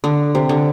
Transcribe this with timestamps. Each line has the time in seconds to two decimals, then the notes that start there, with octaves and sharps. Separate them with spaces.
0.04 D3
0.35 C3
0.49 D3